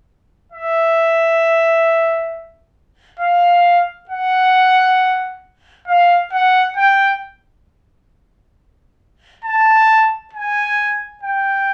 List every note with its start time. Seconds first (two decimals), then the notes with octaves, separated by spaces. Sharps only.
0.52 E5
3.19 F5
4.09 F#5
5.88 F5
6.32 F#5
6.77 G5
9.44 A5
10.33 G#5
11.23 G5